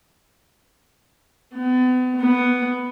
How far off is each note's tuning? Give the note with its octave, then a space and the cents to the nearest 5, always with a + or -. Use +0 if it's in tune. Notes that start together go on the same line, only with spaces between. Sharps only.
B3 +40
B3 +5